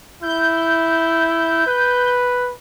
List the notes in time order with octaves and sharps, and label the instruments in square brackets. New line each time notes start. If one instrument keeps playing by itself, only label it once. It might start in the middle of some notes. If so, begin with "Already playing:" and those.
[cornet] E4 [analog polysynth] G6
[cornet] B4